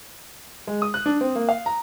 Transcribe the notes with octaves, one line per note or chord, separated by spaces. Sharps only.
G#3
D#6
F#6
D4
C4
A#3
F5
A#5